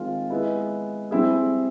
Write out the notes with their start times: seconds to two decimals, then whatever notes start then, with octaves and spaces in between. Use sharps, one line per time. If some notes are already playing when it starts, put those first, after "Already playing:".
Already playing: D#3 G#3 C4 F4
0.30 G#3 B3 E4
1.11 G3 C4 E4 G#4